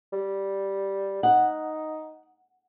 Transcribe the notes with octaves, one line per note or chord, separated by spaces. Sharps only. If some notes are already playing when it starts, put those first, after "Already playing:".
G3
D#4 F#5